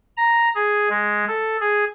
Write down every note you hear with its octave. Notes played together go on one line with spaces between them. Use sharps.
A#5
G#4
G#3
A4
G#4